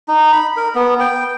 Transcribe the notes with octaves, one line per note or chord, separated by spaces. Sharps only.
D#4
B5
A#4
B3
G5